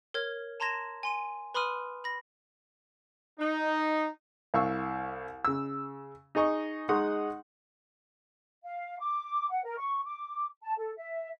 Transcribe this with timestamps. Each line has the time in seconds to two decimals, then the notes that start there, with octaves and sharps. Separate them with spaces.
0.14 A#4 C#5 F6 G#6
0.60 A5 A#5 C6 G#6 A#6 E7
1.03 G#5 C6 D#7
1.54 B4 B5 C6 D#6 F6 D#7
2.04 B5 A#6
3.39 D#4
4.54 C2 F5 C#6 E6
5.45 C#3 E6
6.35 D#4 G#4 D#5 C#6
6.89 G#3 D#4 F#5 C6 C#6 D#6
8.64 F5
8.99 D6
9.50 F#5
9.64 A#4
9.77 C#6
10.04 D6
10.62 A5
10.77 A4
10.96 E5